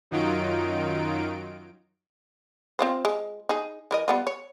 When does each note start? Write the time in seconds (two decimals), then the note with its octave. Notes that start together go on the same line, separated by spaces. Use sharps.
0.11 F#2 D#3 F#3 D#4 F4 D7
2.79 C4 F4 C5
3.05 G#3
3.49 D#4 G#4
3.91 E3 A#4 D#5
4.08 G3 B3 F4
4.27 C#5